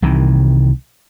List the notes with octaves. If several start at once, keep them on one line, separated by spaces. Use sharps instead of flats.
C2 C3 D#3 E3